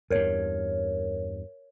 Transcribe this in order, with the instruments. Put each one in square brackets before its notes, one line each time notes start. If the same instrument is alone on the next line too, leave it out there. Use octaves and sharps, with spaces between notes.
[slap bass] E2 G2 [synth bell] A#4 C#5